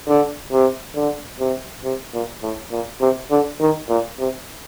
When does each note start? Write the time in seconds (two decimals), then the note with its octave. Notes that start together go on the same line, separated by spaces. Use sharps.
0.08 D3
0.52 C3
0.96 D3
1.40 C3
1.84 C3
2.14 A#2
2.43 A2
2.72 A#2
3.01 C3
3.31 D3
3.61 D#3
3.89 A#2
4.19 C3